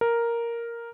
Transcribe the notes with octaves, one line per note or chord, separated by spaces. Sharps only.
A#4